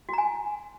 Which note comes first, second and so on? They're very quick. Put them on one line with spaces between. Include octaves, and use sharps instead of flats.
F#4 A#5 G#5